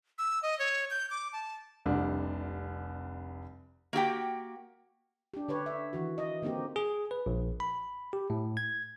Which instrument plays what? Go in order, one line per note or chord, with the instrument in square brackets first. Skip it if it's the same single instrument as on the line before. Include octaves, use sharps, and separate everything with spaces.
[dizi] E6
D#5
C#5
G6
D6
A5
[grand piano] F1 C2 D4
[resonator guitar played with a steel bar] A#3 F#4 G4 G5
[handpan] D4 G4
D3 G4 B4 C#5
E5
D#3 E3 F#4
D#5
D3 A#3 C4 D#4 G4
[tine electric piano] G#4
B4
A#1
B5
G4
A2
G#6